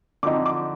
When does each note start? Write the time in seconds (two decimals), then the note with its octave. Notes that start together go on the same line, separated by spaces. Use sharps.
0.23 D3 F3 C4 D#4 D6
0.46 D6